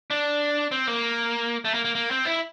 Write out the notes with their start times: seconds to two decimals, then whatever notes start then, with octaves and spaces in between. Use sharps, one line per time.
0.10 D4
0.71 C4
0.87 A#3
1.65 A3
1.74 A#3
1.85 A#3
1.95 A#3
2.11 C4
2.25 E4